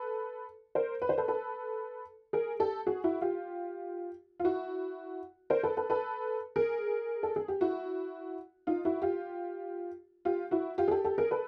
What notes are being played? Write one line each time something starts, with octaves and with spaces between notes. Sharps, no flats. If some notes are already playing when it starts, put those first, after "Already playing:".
Already playing: A4 B4
A#4 C5
B4
C5
A4 B4
A4 B4
G#4 A#4
G4 A4
F#4 G#4
E4 F#4
F4 G4
F4
E4 F#4
A#4 C5
A4 B4
A4 B4
A4 B4
G#4 A#4
A4
G#4
G4
E4 F#4
D#4 F4
E4 F#4
F4 G4
F4 G4
E4 F#4
F4 G4
G#4
G4 A4
G4 A4
G#4 A#4
A4 B4